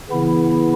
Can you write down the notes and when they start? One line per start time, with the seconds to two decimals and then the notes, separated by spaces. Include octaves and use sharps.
0.10 C#3 E3 B3 E4